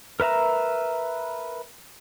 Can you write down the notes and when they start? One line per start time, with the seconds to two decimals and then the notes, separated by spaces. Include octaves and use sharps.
0.20 A#4 B4 E5 A#5